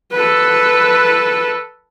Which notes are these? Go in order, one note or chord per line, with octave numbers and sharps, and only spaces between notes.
A4 B4